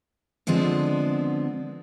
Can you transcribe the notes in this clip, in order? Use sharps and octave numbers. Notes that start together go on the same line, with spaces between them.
D3 F3 G#3 B3 C4 D4